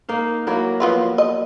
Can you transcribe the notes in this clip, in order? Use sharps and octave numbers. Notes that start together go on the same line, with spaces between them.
A#3 D#4 F5
F#3 A#3 E4
F3 B3 F4
D#5